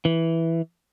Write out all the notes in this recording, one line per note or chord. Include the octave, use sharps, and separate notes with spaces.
E3